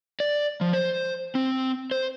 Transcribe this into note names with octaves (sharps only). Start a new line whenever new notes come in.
D5
F3
C5
C4
C5